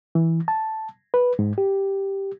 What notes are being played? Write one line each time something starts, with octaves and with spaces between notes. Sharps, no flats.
E3
A5
B4
G#2
G4